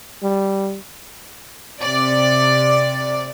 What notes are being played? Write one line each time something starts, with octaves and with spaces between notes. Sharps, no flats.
G3
C3 D5